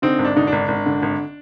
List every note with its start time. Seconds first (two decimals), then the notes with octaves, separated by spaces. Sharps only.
0.02 D3 C4 D#4
0.19 G#1
0.25 D4
0.36 D3 D#4
0.47 G#1 D4
0.68 G#1
0.86 D3
1.02 G#1